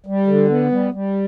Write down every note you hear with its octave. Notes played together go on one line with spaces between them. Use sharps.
G3
D3
B3
G3
G3